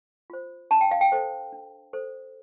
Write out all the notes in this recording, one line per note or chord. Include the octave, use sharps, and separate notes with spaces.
F4 C5
D4 A5
G5
F5
G5
A4 C5
D4
A4 C5